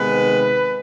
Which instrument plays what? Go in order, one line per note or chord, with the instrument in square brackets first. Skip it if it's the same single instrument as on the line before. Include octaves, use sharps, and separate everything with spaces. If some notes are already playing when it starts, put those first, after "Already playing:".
Already playing: [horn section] C3 D#3 G#3 B3 B4